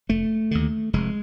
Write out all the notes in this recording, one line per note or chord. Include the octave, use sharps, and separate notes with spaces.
F1 A3
D#2 D3
F1 G#3